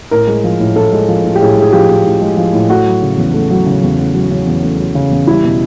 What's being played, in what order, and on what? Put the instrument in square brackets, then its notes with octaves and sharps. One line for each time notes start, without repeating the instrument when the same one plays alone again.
[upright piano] A2 A#4
G#3
F3
A2
A2 A4
G#3
F3
A2
G4
A2 G#4
G#3
G#4
F3 G4
A2
A2
G#3
F3
A2
A3 F#4
F#3
C#3
E2
A3
F#3
C#3
E2
A3
F#3
C#3
E2
A3
F#3
C#3
E2
G3 E4
B2